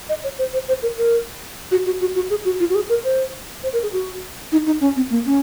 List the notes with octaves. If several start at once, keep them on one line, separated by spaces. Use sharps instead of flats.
D#5
C#5
C5
C5
C5
A#4
A#4
F#4
F#4
F#4
F#4
G#4
F#4
F4
F#4
G#4
A#4
C5
C5
A#4
G#4
F#4
D#4
D#4
C#4
C4
A#3
C#4